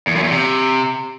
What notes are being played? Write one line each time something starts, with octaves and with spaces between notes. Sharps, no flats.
E2
F#2
E2
C3